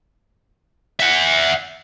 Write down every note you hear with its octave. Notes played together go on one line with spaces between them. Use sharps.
E5 F#5